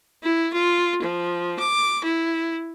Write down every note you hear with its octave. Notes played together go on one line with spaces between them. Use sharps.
E4
F4
F3
D6
E4